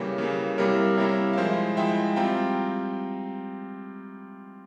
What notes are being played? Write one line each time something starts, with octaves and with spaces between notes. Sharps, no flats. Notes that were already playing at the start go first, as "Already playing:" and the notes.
Already playing: C#3 E3 G3 A#3 A#4 C#5
C#3 E3 G3 A#3
C3 G3 A#3 E4 A#4 C#5
C3 G3 A#3 E4 A#4 C#5
F5
F3 G#3 E4 C5 E5
F3 G#3 E4 E5 G5
G3 C4 F4 G5 A#5